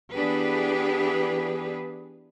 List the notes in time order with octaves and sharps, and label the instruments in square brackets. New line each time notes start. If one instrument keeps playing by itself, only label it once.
[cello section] E3 B3 D4 G4 G#4 B4